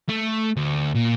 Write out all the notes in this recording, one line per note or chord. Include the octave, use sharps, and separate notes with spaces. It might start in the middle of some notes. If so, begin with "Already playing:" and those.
A3
D2
A#2